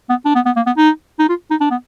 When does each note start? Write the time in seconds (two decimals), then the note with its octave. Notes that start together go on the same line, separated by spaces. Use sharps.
0.09 B3
0.25 D4
0.35 B3
0.46 B3
0.56 A#3
0.66 B3
0.77 D#4
1.19 D#4
1.29 F4
1.50 D#4
1.61 D4
1.71 B3